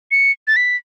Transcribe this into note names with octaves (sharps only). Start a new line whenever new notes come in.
C#7
A6
B6